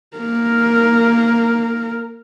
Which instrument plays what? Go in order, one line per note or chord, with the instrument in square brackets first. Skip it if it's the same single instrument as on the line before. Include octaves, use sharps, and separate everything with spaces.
[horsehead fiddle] A#3 A#4